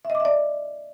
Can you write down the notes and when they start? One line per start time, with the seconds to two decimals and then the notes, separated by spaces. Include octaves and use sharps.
0.05 E5
0.10 D#5
0.15 D6
0.20 E5
0.25 D5